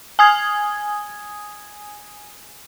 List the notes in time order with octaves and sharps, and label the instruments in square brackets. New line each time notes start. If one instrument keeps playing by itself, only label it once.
[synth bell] G#5 D#6 G#6